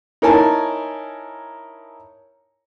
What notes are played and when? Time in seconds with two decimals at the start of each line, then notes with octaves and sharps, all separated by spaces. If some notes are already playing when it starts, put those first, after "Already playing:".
0.22 D#4 E4 A#4 C#5 G#5 A5